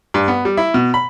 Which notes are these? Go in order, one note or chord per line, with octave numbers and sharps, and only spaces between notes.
G2
B3
G3
E4
B2
B5